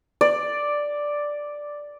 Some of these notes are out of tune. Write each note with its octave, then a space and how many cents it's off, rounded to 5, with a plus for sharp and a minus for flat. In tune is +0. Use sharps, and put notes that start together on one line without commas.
D5 +0